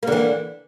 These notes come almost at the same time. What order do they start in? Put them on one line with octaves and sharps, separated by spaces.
A#3 D3 E3